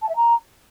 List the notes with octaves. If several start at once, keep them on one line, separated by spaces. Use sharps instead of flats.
A5
E5
A#5